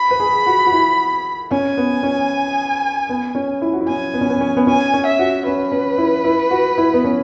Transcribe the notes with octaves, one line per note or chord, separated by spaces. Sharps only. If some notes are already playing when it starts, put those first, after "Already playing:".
Already playing: B5
B4
G#4
F#4
F#4
E4
C#4 G#5
B3
C#4
B3
C#4
E4
F#4
E4
C#4 G#5
B3
C#4
B3
C#4
B3
C#4 G#5
C#4
E5
F#4
C#4 B4
C#4
E4
E4
F#4
E4
B3
C#4